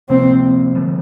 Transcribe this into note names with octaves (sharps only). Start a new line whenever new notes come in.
C3 F3 A#3 C4
D3 F3 A3